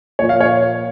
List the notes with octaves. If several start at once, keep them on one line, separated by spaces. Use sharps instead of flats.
A#2 F3 C#5
F5
C#5